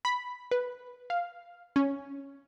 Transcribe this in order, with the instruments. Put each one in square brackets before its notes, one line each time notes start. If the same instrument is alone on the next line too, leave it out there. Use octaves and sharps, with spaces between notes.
[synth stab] B5
B4
F5
C#4